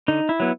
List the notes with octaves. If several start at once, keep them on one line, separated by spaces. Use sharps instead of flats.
D3 D#4
E4
F#3 B3